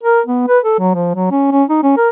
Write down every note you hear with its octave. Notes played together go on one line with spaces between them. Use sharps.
A#4
B3
B4
A4
F#3
F3
F#3
C#4
C#4
D#4
C#4
A#4